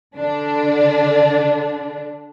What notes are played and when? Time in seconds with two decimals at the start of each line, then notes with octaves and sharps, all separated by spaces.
0.16 D3 D4